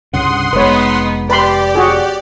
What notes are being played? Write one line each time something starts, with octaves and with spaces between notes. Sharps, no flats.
C2 G2 C#3 F#5 C6 D#6
F1 G#3 B3 D#4 B4 C#5
G4 B4 D5 B5 C6
F#4 G#4